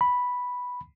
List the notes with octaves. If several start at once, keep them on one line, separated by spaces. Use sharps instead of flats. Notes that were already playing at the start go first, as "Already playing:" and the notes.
B5